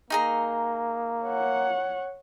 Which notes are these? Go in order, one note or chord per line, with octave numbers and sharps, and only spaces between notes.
A#3 D#4 G#4 A#5
C#5 F#5